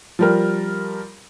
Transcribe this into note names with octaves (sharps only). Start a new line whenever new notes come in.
F3 G3 A#4